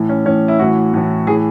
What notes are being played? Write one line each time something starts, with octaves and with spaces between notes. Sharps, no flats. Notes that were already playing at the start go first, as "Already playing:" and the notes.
Already playing: A2 E3
C#4
A2 E3 C#4
E4
A2 E3 F#4
A2 E3
A2 E3 G#4